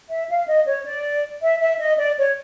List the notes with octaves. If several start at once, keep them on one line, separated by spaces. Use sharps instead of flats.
E5
F5
D#5
C#5
D5
E5
E5
D#5
D5
C#5